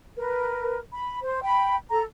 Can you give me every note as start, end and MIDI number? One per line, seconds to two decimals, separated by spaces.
0.16 0.78 70
0.16 0.78 71
0.91 1.18 83
1.22 1.42 72
1.43 1.75 79
1.43 1.75 83
1.91 2.03 69
1.91 2.03 82